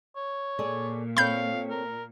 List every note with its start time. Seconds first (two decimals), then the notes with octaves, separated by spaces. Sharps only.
0.17 C#5
0.59 A#2 G#4 A4 D5
1.17 C4 A4 C#5 F5 B5 G6
1.71 A#4